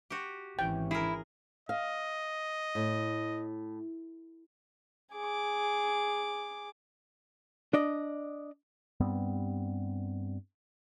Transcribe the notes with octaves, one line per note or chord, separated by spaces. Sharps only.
F#4 G4
G#1 E3 C#4 G5
E4 G#4 A#4
D#5 F5
A2
G#4 D6
D4 D5 D#5
G2 G3 B3 C4